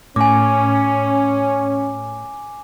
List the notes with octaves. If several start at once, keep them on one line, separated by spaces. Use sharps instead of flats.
A2 C#4 G#5 D6